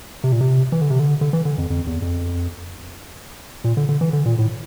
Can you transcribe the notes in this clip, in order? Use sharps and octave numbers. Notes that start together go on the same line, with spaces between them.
C3
A#2
C3
E3
D3
C3
D3
D3
E3
D3
F2
F2
E2
F2
A#2
D3
D3
E3
D3
A#2
A2